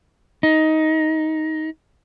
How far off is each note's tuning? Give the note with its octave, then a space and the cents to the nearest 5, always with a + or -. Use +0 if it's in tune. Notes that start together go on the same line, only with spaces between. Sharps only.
D#4 +15